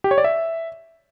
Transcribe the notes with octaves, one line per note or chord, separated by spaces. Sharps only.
G4
C#5
D5
E5